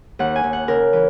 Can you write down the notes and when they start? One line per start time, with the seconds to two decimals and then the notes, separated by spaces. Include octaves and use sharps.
0.19 D#2 F#5
0.36 G#5
0.44 D#2
0.53 F#5
0.68 C#3 A#4
0.93 E3